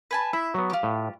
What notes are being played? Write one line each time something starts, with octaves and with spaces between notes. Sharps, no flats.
B4 G#5 A5
E4 E5
F#3 B3
F4 G4
A2